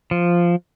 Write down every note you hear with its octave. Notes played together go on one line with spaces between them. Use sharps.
F3